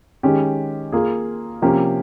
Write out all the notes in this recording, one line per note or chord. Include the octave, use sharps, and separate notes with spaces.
D#3 G#3 C#4 G4
A#3 F4 G#4
C3 F3 A#3 C#4 G4